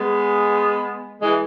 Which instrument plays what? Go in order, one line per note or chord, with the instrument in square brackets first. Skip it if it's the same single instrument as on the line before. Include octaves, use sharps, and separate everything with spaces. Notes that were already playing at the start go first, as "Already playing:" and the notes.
Already playing: [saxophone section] G#3 B3
E3 G#3